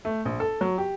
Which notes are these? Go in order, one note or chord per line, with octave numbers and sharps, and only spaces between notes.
A3
A#1
A4
F#3
G4